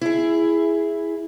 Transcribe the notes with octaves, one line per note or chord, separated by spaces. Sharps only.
E4 G#4